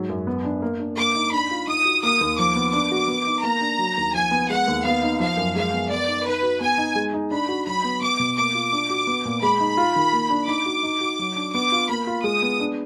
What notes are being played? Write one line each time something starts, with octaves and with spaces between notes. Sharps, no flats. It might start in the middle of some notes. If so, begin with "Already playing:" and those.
Already playing: G#2 F#3
F#2
B3
D4
A#3
D4
A#3 D6
D#4
D4 B5
F4
D#4 D#6
F#4
A#3 D#6
D#2
F3 D6
B3
D4 D6
F#4
B3
D#4
A#3 A#5
D4
F#3
D#2
F3 G#5
B3
G#3 F#5
D#2
B3 F5
D#4
F3 F5
F#2
G#3 F5
B3
B3 D5
D#4
D#4 B4
F#4
B3 G#5
D#4
G#3
D#4
D4 B5
F#4
F#3 B5
B3
B3 D6
B2
A#3 D6
F4
D4
F#4
B3
A#2
G#3 B5
D#4
F4
D#3
A#3
D4
D#4 D6
F#4
D#4
F#4
F#3
D4
B3 D6
F4
A#3 B5
F4
G#3 D#6
B3
D4